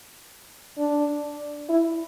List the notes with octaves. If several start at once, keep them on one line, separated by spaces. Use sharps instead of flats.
D4
E4